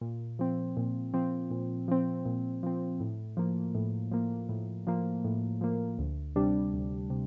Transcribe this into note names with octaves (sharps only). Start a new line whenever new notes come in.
A#2
F3 C4
A#2
F3 C4
A#2
F3 C4
A#2
F3 C4
A2
F3 A#3
A2
F3 A#3
A2
F3 A#3
A2
F3 A#3
D2
C3 G3 D4
D2
C3